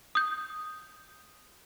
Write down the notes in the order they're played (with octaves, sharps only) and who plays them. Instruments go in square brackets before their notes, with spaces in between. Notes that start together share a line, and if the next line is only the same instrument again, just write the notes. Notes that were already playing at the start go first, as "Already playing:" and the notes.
[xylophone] D#6 G6